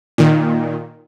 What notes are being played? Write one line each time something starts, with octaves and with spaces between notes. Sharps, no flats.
A#2 D#3